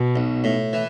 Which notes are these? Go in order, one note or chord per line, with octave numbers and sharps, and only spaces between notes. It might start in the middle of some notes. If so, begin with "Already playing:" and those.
Already playing: B2
B1
A2
E3